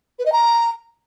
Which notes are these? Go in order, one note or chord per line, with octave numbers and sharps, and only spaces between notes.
B4
D#5
A#5